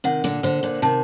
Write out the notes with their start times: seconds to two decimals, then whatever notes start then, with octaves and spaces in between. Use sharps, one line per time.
0.04 C3 D#3 F#5
0.24 A#2 D3
0.43 A#2 D3 C5
0.63 A#2 D3
0.82 C3 D#3 A5